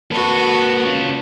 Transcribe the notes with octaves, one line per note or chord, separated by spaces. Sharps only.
A#3 F#4 A4 B4
C#4 F4